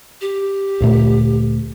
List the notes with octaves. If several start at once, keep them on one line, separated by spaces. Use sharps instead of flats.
G4
D2 A#2 A3